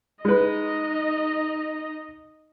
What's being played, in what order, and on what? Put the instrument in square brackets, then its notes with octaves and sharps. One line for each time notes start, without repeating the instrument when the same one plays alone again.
[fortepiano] G#3 B4 [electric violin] D#4 D#5